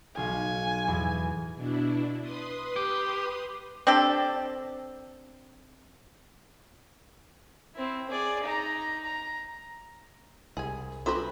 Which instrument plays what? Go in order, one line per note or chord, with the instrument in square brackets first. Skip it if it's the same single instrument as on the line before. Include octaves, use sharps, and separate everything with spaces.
[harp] B1 F5 [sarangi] G#5
[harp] E2 A2
[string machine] B2 D4 E4
B4 C6 D#6
[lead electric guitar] G4
[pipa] C4 D4 G4 A4
[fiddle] C4 E4
G#4 D5
D#4 A#5
A#5
[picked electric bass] C2 [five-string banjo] G#4 G#5
[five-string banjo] C4 F#4 B4 [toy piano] F4 A4 F#5